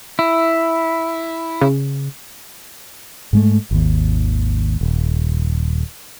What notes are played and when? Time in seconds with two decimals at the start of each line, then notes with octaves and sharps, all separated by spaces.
0.19 E4
1.61 C#3
3.33 G#2 G#3 A3
3.71 G#1 D#2
4.81 D#1